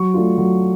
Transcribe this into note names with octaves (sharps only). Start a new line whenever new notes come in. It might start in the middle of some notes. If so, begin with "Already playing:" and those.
Already playing: F#3 C#6
A3 D4 F4
F#3